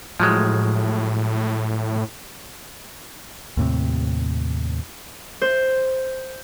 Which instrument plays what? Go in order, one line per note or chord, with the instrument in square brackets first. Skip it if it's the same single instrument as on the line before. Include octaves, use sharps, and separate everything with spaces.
[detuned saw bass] A2 [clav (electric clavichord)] F3 F#3 G#3
[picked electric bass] D#2 A2 C3
[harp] C5